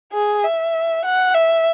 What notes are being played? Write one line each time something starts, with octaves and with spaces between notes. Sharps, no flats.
G#4
E5
F#5
E5